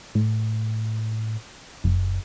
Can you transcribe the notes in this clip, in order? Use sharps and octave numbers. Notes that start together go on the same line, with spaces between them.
A2
F#1